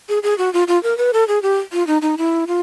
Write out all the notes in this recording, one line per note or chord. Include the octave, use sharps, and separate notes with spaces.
G#4
G#4
F#4
F4
F4
A#4
B4
A4
G#4
G4
F4
D#4
D#4
E4
F4